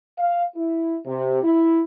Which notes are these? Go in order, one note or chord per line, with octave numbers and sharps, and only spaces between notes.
F5
E4
C3
E4